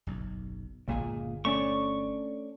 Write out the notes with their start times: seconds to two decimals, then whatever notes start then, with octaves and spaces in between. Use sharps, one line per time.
0.07 F#1 B1
0.88 D1 G1 C#2 A#2 G#4
1.45 A3 C#4 D4 C#6